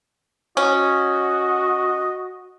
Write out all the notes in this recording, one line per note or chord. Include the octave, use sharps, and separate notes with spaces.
C#4 F#4 D#5